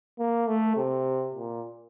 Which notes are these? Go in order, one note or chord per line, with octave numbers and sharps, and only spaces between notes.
A#3
A3
C3
A#2